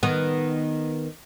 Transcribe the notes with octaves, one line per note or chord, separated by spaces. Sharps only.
D#3 B3